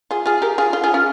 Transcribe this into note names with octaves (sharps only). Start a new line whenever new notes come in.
F4 G#4
F4 G#4
G4 A#4
F4 G#4
F4 G#4
F4 G#4
C#4 F4